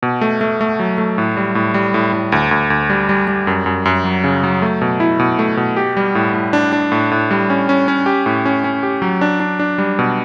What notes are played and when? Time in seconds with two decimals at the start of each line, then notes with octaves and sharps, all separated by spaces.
0.03 B2
0.21 A3
0.41 A3
0.61 A3
0.79 F#3
0.98 A3
1.18 A2
1.37 G3
1.55 A2
1.74 G3
1.94 A2
2.13 A2
2.32 D2
2.51 D2
2.70 D2
2.90 G3
3.09 G3
3.28 G3
3.47 F#2
3.66 F#2
3.85 F#2
4.05 F#3
4.24 C#3
4.44 F#3
4.62 A3
4.82 B2
5.00 E4
5.19 B2
5.39 A3
5.57 B2
5.77 G4
5.97 G3
6.15 A2
6.34 A2
6.53 D4
6.73 D4
6.92 A2
7.11 A2
7.31 G3
7.50 C#4
7.69 C#4
7.88 C#4
8.06 G4
8.26 A2
8.46 C#4
8.64 C#4
8.83 G4
9.02 F#3
9.21 D4
9.40 D4
9.59 D4
9.78 G3
9.99 B2